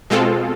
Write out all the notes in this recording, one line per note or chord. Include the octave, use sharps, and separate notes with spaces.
B2 G#3 C4 F4 A4